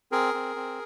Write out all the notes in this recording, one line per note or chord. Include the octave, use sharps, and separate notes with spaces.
C4 G#4 A#4
C4
C4